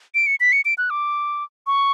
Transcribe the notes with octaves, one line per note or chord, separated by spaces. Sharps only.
D7
C#7
B6
C#7
D7
F#6
D6
C#6